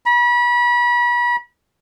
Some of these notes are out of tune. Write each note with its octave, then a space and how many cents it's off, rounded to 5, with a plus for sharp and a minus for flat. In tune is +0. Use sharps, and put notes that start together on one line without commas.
B5 -35